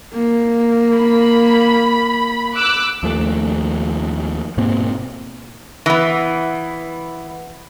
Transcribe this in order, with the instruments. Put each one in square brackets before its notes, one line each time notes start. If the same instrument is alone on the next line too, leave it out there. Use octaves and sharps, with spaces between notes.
[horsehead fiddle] A#3
[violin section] B5
D6 E6 F#6
[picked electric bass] D#2 F3 A3
G#2 B2 A#3 C4
[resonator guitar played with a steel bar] E3 B3